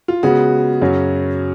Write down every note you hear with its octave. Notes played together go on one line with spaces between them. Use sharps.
F4
C#3 G#3 B3 F#4
F#2 C#3 F#3 C#4